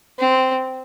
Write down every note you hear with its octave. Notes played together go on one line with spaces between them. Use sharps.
C4